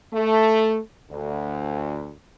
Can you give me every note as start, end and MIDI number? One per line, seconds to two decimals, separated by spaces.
0.14 0.78 57
1.11 2.11 38